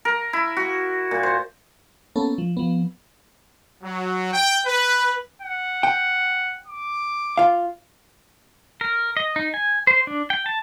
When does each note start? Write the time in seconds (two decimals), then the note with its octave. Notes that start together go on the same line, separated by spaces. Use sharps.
0.05 A#4
0.33 E4
0.57 F#4
1.11 A#2
1.23 C5
2.16 A#3 B3 C#4 A4
2.38 F3
2.57 F3 B3
3.83 F#3
4.33 G5
4.66 B4
5.42 F#5
5.83 G5
6.67 D6
7.38 F4 F5
8.81 A#4
9.17 D#5
9.36 D#4
9.54 G#5
9.87 C5
10.07 D4
10.30 G5
10.46 A5